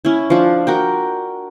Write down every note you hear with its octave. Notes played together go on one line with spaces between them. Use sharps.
C#4 E4
F3 D4
F#4 A#4 G5